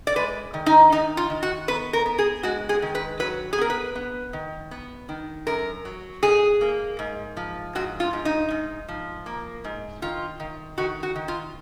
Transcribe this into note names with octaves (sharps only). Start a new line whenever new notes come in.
D5
G#3 B4
D#3
D#4
D#3 D#4
F4
D#3
F#4
B3 B4
A#4
B3
G#4
G#3 F#4
G#4
D#3
B4
F#3 B4
G#4
B3 A#4
B4
B3
D#3
B3
D#3
F#2 A#4
F#3
G#2 G#4
A#3
G#2
F3
G#2 F#4
F4
G#2
D#4
G#2
F3
A#3
G#2
D#3 F4
D#3
D#3 F#4
F#4
D#3
F4